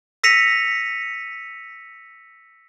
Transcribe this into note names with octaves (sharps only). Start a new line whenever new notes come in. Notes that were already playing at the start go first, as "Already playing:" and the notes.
E6 A#6 B6 C#7 D#7 F7